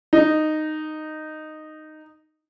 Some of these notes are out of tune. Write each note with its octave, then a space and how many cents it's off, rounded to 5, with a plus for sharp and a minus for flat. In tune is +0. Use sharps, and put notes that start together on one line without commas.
D#4 -10